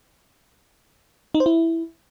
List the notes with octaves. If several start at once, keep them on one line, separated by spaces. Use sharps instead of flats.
D#4
C5
E4